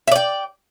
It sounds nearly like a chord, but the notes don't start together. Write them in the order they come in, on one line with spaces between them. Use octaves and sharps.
E5 D5 G5